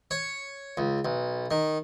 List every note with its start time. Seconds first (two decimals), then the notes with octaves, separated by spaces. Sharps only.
0.11 C#5
0.77 C#2
1.05 B1
1.51 D#3